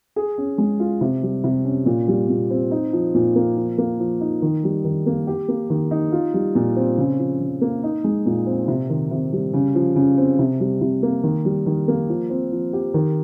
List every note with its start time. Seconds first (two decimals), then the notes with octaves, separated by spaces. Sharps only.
0.16 G#4
0.38 C#4
0.58 G#3
0.80 F4
1.01 C3
1.23 G3
1.44 C3
1.65 C#4
1.86 A#2
2.08 G3
2.29 A#2
2.50 C4
2.71 D#4
2.93 F3
3.14 A#2
3.36 A#3
3.57 F3
3.78 A#3
3.99 F3
4.21 D#4
4.42 D#3
4.64 G3
4.85 D#3
5.06 A#3
5.27 G4
5.48 A#3
5.70 D#3
5.91 D#4
6.12 F4
6.34 G3
6.55 A#2
6.76 C4
6.98 C#3
7.19 F3
7.40 C#3
7.61 A#3
7.83 D#4
8.04 G#3
8.26 A#2
8.47 C4
8.68 C3
8.90 D#3
9.11 C3
9.33 G3
9.53 C#3
9.75 F3
9.96 C#3
10.18 C4
10.39 C3
10.60 G3
10.81 C3
11.03 A#3
11.23 D#3
11.45 G3
11.66 D#3
11.88 A#3
12.09 F3
12.30 C4
12.52 F3
12.73 G4
12.94 D#3